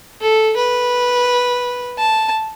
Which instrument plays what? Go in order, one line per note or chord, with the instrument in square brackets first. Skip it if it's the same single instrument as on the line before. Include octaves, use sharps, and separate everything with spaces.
[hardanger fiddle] A4
B4
A5